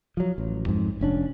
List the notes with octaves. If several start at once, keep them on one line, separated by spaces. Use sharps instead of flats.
F3 F#3
A1
F2 G#2
F1 C#4 D4